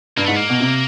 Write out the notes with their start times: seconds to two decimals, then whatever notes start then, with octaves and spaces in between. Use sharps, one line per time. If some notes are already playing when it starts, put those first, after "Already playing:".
0.17 G2 A#3
0.26 G#2 A3
0.35 A#3
0.50 B2
0.60 C3